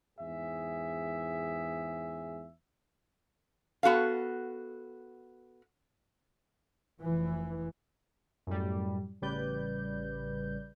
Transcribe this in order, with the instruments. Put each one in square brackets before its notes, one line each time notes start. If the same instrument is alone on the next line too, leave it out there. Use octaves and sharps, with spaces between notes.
[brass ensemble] E2 G#2 G#4 E5
[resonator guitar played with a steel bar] B3 F#4 A4 F5
[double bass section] F1 E3
[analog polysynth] F#2 A2 G3
A1 C#3 G3 B4 D5 G6